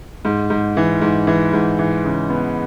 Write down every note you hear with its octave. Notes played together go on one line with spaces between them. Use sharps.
G#2
G#2
E3
G#2
E3
G#2
E3
C#3
B3